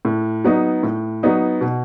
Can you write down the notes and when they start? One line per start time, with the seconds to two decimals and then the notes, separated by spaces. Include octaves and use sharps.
0.05 A2
0.44 F#3 B3 D#4
0.83 A2
1.23 F#3 B3 D#4
1.61 B2